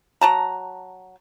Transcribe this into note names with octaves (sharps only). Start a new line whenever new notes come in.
F#3 A5 A#5